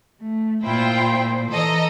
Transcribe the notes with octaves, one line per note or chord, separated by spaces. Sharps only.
A3
A#2 E4 F4 C5 G5
E3 A4 D#5 A#5